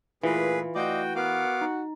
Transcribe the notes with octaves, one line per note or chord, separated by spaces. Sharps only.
A#2 E3 A3 F4 G#4 B4 F5
A3 F4 F#4 D5 D#5 G5 G6
B3 F#4 A#4 F5 F#5 D6
D#4